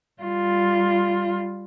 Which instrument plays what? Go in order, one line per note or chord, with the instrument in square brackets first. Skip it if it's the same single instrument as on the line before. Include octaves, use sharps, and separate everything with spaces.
[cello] G3 F4